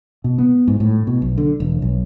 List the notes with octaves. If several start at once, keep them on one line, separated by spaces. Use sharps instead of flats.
B2
B3
G#2
A2
B2
B1
D3
E1
B1